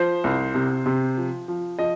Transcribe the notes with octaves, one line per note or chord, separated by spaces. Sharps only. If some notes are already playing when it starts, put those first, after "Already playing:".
Already playing: F3 C5
C2
C3
C3
F3
F3
F3 D#5